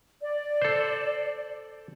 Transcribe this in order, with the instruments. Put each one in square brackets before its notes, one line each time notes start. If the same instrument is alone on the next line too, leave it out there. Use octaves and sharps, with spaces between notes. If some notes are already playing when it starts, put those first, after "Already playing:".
[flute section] D5
[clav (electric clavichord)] A4 C5